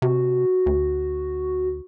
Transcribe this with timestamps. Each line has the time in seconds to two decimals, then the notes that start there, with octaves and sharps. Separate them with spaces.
0.02 C3 F#4
0.66 D2